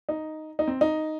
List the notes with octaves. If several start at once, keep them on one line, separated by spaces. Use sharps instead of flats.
D#4
D#4
C4
D#4